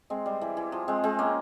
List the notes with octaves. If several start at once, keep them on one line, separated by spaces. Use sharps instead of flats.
G#3 C4
G3
E3
E3
F3
G#3 C4
G#3 C4
A#3 C#4